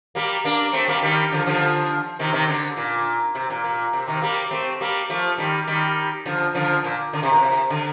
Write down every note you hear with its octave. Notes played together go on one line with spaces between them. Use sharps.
G3 A#3
A#3 D4
A3 C4
G3 A#3
D#3 G3
D3 F3
D3 F3
C3 D#3
C3 D#3
D3
A#2
C3
A#2
A#2
C3
C3 D#3
G3 A#3
A3 C4
G3 A#3
F3 A3
D#3 G3
D#3 G3
D3 F3
D3 F3
A#2
D3
C3
A#2
C3
D3